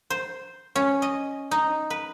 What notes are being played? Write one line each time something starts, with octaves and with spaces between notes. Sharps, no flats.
C5
C#4
D#5
D#4
B4